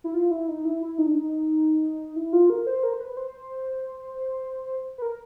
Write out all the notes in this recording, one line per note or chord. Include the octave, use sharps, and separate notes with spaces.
E4
F4
E4
D#4
E4
E4
D#4
D4
D#4
E4
F4
A#4
C5
A#4
C5
B4
C5
B4
A#4